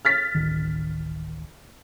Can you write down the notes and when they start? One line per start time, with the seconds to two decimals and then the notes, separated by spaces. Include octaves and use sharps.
0.05 F6 A6 B6
0.35 D1 A1 D#3